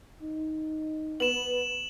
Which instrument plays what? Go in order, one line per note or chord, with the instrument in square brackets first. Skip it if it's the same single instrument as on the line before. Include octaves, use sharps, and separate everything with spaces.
[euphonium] D#4
[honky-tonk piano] B3 [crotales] E7 F#7